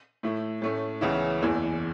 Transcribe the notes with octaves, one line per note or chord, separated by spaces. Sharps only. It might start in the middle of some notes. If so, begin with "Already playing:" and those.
A2 A3 E4
A2 A3 C#4
C#2 C#3 E3 B3 E4
F#1 E2 E3